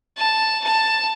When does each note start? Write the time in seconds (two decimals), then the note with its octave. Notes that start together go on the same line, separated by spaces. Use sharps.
0.17 A5
0.64 A5